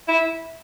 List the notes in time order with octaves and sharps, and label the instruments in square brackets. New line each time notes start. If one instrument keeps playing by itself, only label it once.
[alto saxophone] E4